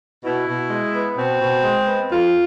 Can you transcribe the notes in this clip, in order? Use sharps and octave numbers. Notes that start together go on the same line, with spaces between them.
B2 E4
B2
G#3
B3
B2 C4
B2
G#3
B3
F2 F4